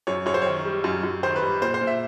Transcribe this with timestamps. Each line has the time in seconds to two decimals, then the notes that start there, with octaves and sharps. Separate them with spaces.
0.07 F#2 C#5
0.26 F#2 C#5
0.34 C5
0.42 D#3 C#5
0.65 G3
0.84 F#2
1.03 F#2
1.23 D#3 C5
1.36 B4
1.43 G3
1.62 A#2 C5
1.74 C5
1.81 A#2
1.87 E5